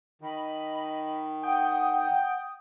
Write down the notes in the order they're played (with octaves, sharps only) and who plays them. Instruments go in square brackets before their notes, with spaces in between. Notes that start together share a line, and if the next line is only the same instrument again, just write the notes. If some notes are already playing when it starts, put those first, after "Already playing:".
[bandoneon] D#3 [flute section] D#5 B5
[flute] F#5 [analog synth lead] G5 [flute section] D#6